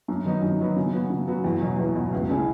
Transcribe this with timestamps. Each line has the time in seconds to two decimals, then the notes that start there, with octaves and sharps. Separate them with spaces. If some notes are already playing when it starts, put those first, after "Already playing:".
0.08 F#2
0.25 D#3 F#3 B3 D#4
0.42 F#2
0.59 D#3 F#3 B3 D#4
0.76 C#3
0.93 F#3 B3 F#4
1.10 C#3
1.27 F#3 B3 F#4
1.44 E2
1.61 B2 F#3
1.78 E2
1.95 B2 F#3
2.12 C#2
2.29 C#3 G#3 C#4 E4